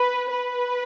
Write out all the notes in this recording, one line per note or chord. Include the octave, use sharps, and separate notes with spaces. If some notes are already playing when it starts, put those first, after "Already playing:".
Already playing: B4
B4